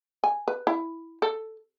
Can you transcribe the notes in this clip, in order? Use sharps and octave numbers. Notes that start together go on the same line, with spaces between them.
G#5
B4
E4
A4